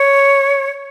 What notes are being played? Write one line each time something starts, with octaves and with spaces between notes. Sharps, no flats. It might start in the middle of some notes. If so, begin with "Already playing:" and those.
Already playing: C#5